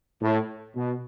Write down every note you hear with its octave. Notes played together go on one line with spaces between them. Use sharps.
A2
B2